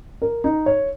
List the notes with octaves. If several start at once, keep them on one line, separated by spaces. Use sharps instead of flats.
A#4
D#4
C#5